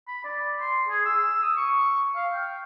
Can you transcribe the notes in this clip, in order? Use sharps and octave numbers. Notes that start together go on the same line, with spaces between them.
B5
D5
C6
G#4
E6
D#6
C#6
F5
G5